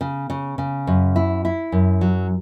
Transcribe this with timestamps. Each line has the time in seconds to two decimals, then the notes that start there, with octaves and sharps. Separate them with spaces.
0.01 C#3
0.30 C#3
0.58 C#3
0.87 F#2
1.16 E4
1.45 E4
1.72 F#2
2.01 F#3